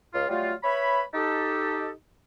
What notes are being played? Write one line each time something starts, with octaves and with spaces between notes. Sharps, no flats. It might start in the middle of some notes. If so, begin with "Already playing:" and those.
C#2 F4 F5
F#3 G3 A3 F4
B4 C#5 E5 B5
D#4 G4 A4